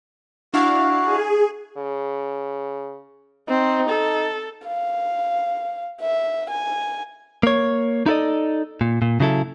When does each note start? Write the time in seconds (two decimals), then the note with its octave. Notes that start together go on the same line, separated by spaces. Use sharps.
0.54 D4 E4 F#4 F5
1.02 G#4
1.77 C#3
3.49 C4 D#4
3.89 A4
4.67 F5
6.01 E5
6.50 G#5
7.43 A#3 C#5
8.06 D#4 E4 A4 D5 D#5
8.81 A#2
9.02 A#2
9.20 C#3 F#3 E4 A4